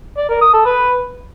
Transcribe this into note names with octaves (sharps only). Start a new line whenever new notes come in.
D5
A#4
D#6
A4
B4